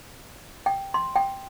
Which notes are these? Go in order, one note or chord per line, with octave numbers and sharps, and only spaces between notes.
G5
C6
G5